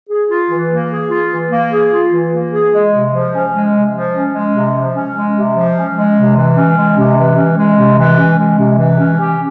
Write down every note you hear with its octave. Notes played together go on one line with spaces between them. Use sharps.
G#4
F4
E3
A#3
G#4
F4
E3
A#3
G#4
F4
E3
A#3
G#4
G#3
C3
F3
C#4
G#3
C3
F3
C#4
G#3
C3
F3
C#4
G#3
C3
F3
C#4
G#3
C3
E3
C#4
G#3
C3
E3
C#4
G#3
C3
E3
C#4
G#3
C3
E3
C#4
G4